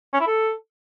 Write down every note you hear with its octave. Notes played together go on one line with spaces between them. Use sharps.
C#4
E4
A4